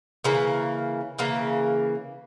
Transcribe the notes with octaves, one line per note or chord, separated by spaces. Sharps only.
C#3 E3 A#3
C#3 E3 A#3